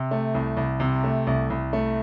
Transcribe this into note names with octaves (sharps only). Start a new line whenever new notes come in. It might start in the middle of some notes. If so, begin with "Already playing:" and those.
Already playing: C3
A3
C2
C2
C3
A3
C2
C2
A3